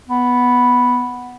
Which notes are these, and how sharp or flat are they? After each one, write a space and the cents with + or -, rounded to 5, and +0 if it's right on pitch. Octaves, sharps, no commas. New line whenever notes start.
B3 +0